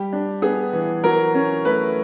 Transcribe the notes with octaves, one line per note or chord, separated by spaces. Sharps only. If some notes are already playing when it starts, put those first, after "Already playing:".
Already playing: G3 G4
D4
B3 G#4
E3
F#3 A#4
C#4
A3 B4